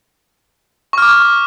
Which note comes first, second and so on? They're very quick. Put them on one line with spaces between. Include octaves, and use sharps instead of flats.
C#6 F6 D6